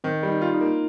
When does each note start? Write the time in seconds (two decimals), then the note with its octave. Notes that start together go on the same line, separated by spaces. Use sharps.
0.04 D#3 C4
0.23 G3
0.28 D#4
0.41 F4
0.54 D#4
0.60 A#3